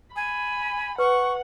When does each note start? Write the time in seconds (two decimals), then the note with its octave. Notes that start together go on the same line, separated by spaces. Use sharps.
0.16 G#5 B5
0.98 B4 F#5 C#6